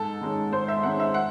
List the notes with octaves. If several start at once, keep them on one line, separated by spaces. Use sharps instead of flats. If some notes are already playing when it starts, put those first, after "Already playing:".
Already playing: G#2 A4
D#3 G#3 C#4
G#2 C5
E5
D#3 G#3 C#4 F#5
E5
F#5